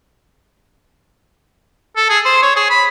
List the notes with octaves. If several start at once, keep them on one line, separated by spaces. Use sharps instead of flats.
A4
G#4
C5
C#5
G#4
B5